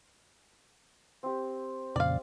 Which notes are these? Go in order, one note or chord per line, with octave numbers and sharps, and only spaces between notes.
C4 G4
F2 A#2 C#3 D5 F5